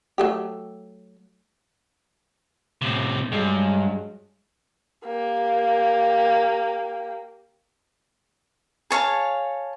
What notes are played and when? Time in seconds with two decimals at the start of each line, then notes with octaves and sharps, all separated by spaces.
0.18 F#3 A3 G4
2.82 A2 C3
3.32 G2 F#3 G#3
5.07 A#3 G4
8.90 G#4 C#5 F5 A5